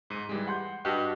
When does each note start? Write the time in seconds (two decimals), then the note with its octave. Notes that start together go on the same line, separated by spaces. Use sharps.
0.10 G#2 D#7
0.29 E3 G3 G#3
0.48 F#5 C6 G6
0.85 G2 F#4 G4 D#5